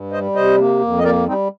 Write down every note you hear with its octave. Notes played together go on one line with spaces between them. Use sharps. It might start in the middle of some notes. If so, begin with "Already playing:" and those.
Already playing: G2
G3 C5 D#5
C3 C5 D#5
A#3
F2
D#5
A#3 A#4 D5
G3 C4 D#4